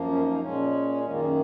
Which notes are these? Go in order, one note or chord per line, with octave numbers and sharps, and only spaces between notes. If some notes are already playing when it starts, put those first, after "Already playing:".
Already playing: F#2 F3 A#3
C#4
D#4
D#4
A#2 G#3 C#4
F#2 D#3 A#3 C#4
F4
G#4